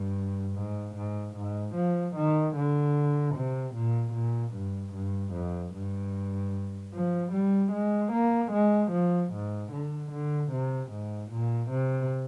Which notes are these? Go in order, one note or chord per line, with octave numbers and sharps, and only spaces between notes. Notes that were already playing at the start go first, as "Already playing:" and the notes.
Already playing: G2
G#2
G#2
G#2
F3
D#3
D3
C3
A#2
A#2
G2
G2
F2
G2
F3
G3
G#3
A#3
G#3
F3
G#2
D3
D3
C3
G#2
A#2
C3